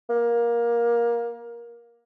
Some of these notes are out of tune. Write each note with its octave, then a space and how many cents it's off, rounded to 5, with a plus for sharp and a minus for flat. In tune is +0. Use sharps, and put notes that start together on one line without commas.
A#3 +15